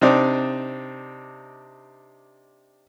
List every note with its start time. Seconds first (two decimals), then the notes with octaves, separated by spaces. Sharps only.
0.01 C3 C4 D4 D#4 D5